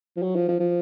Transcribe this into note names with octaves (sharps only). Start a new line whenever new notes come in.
F3
F#3
F3
F3
F3